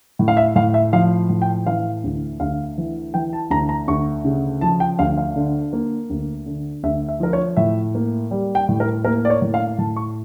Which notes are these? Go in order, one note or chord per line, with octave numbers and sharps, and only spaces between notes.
A2
F5
E5
A2 F5
E5
F3 F5
A2
G5
E3 F5
D2
D2 F5
E3
E3 G5
A5
D2 A#5
A#5
D2 C#6
C#3
F3 A5
G5
D2 F5
F5
D3
A#3
D2
D3
D2 E5
E5
F3 A#4
C#5
A2 E5
A#3
G3
G5
A2
A#4
A#3 A#4
D5
C#5
A2
F5
A2 A5
C#6